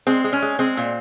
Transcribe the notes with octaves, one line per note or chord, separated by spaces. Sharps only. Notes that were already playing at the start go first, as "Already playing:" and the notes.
G#3 C4
G#3
C#4
G#3
G#3 C4
A#2